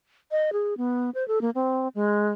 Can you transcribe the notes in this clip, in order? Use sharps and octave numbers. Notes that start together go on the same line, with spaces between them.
D#5
G#4
B3
C5
A4
A#3
C4
G#3